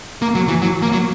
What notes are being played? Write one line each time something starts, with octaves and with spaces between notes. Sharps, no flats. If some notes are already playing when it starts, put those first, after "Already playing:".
A#3
F#3
E3
F#3
A#3
F#3